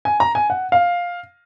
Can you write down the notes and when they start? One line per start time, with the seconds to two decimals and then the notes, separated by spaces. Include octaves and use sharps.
0.05 G#5
0.20 A#5
0.35 G#5
0.50 F#5
0.72 F5